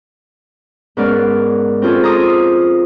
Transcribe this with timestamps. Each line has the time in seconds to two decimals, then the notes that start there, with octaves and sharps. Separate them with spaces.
0.97 G#2 B3 C#4 A#4 D5 F6
1.82 C4 C#4 F4 G#4 A4
2.03 A#5 C6 D6 D#6